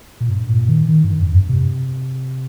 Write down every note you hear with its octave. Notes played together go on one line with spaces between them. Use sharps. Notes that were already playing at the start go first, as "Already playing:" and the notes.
A#2
G2
A#2
D#3
D#3
G2
F2
G2
C3